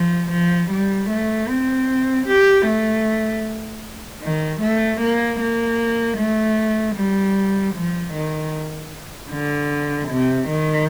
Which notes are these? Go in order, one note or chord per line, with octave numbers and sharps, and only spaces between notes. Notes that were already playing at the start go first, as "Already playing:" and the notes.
Already playing: F3
F3
G3
A3
C4
G4
A3
D#3
A3
A#3
A#3
A3
G3
F3
D#3
D3
C3
D#3